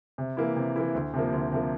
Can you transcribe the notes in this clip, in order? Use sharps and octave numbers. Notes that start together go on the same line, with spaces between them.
C3
E3 A#3 E4
C3
E3 A#3 E4
D2
C3 F3 A#3
D2
C3 F3 A#3